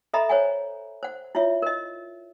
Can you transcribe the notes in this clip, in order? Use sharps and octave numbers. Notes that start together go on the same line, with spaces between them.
A4 D#5 E5 A#5 B5
C5 C#5 F#5 G#5
C5 F#5
E4 F4 C#5 E5
A#4 D#5